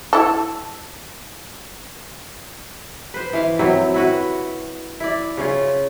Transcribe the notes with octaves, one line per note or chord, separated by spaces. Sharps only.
E4 A4
B4 C5
E3 F5
C3 F#3 C4 E4
E4 F#4 B4
E4 D5
C#3 C#4 F4